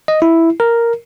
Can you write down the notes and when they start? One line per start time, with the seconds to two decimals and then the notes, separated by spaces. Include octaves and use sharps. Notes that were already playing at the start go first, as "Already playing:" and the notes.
0.08 D#5
0.22 E4
0.60 A#4